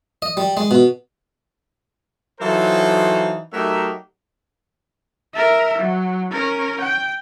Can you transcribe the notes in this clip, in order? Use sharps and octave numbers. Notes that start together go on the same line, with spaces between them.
D#5
G3
G#3
B2
E3 F#3 D#4 F4 A4 C5
F#3 A3 D#4 G4 A#4 E5
A#4 E5
F#3
C#4 A#4
G5